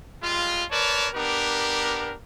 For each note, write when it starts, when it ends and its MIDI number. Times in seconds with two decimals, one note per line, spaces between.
0.23 0.64 55
0.23 0.64 56
0.23 0.64 65
0.71 1.08 70
0.71 1.08 71
0.71 1.08 73
0.71 1.08 74
0.71 1.08 81
1.15 2.15 59
1.15 2.15 62
1.15 2.15 67
1.15 2.15 70